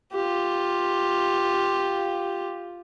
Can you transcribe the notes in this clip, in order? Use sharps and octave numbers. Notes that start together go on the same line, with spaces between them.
F4 G4